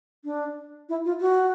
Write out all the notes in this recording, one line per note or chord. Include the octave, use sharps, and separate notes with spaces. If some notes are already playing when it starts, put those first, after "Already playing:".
D4
E4
F4
F#4